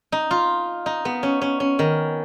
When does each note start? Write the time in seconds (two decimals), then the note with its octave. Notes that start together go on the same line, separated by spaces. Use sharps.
0.12 D#4
0.31 F4
0.86 D#4
1.05 B3
1.23 C#4
1.42 C#4
1.60 C#4
1.79 D#3